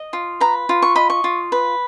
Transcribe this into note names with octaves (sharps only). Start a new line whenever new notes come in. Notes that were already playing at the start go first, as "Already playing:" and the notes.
Already playing: D#5
F4
B4 A#5
F4
C#6
D#5 B5
C#6
F4
B4